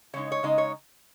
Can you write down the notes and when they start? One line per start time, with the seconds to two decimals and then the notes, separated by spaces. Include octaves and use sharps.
0.13 C#3 G#3 D#4 C#5
0.32 C#5
0.43 C#3 G#3 D#4 D#5
0.58 C#5